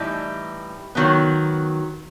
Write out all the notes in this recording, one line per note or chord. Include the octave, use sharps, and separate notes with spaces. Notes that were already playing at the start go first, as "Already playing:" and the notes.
Already playing: A2 E3 G3 D#4
D#3 F#3 B3